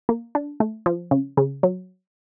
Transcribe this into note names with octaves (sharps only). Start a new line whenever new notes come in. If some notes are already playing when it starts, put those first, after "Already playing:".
A#3
D4
A3
F3
C#3
C#3
F#3